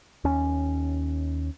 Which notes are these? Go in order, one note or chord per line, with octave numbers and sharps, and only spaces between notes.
D#2 C#4